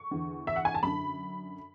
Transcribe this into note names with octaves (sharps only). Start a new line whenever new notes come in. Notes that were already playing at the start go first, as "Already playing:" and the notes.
Already playing: C#6
E2 D3
E5
F#5
G#5
A5
F#2 D3 B5